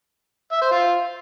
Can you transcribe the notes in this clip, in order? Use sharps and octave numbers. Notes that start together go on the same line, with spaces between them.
E5
C5
F4